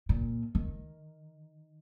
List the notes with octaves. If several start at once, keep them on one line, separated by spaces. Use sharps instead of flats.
A#2
D#3